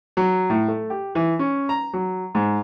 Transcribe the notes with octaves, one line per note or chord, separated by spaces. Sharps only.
F#3
A2
A3
G4
E3
C#4
A#5
F#3
G#2